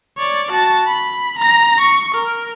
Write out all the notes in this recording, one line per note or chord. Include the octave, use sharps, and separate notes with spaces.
C#5 D5
F#4 A5
B5
A#5 A#6
C#6
A#4